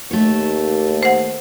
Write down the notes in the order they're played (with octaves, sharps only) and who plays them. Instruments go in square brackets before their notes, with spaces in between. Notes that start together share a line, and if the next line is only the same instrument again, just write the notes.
[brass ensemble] D#2 [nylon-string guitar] A3 C#5
[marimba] C5 F#5